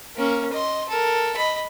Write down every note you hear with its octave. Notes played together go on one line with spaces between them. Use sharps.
A#3 C#4
D#5 C6
A4 A#4
D#5 B5